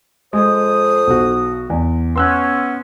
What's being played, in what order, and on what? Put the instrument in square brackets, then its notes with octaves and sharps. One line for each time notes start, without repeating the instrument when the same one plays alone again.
[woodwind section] F2 C5 D#6 [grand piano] G#3
[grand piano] B1 F#4
E2
[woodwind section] B3 C#4 [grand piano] C6 E6 F#6